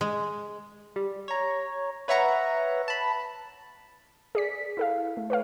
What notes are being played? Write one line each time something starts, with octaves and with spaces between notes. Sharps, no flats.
G#3
G3
C#5 A#5
B4 C#5 E5 F#5 A#5
A5 B5
G#4 D5 B6
E4 A4 F5
A3
B4 C#5 F5